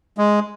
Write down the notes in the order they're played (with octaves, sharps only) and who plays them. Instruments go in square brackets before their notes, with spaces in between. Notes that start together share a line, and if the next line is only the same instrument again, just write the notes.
[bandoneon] G#3